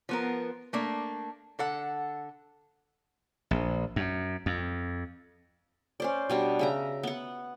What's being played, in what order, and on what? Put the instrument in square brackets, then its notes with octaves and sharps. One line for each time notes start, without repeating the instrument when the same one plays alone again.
[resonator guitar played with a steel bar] F3 B3 A#4
A3 A#3 D4
D3 A4 F#5
[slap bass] A#1
F#2
F2
[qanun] C#4 C5 D5
B2 G3 D4
C#3 E5 A#5
B3 F#5